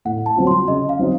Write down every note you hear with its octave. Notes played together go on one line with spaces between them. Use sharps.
A2 F#5
A5
F#3 C4 F4
C6
C#3 D#5
F5
F#3 C4 D#4